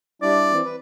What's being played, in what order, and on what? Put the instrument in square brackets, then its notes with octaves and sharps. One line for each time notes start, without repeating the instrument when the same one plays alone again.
[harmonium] G3 D4 E4 [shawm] D5
[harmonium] E3 C4
B4